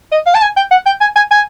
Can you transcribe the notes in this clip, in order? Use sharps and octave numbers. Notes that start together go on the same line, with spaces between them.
D#5
F5
A5
G#5
G5
F#5
G5
G#5
G#5
G#5